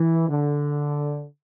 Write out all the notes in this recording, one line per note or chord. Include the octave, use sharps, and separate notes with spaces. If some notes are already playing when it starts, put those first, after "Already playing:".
Already playing: E3
D3